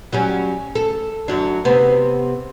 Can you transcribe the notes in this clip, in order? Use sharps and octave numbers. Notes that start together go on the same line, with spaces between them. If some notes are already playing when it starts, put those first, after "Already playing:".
F#3 G3 C#4
A4
F#2 F#3 D4
C3 B3